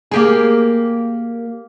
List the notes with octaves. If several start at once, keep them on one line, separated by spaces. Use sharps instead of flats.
A#3 G4 G#4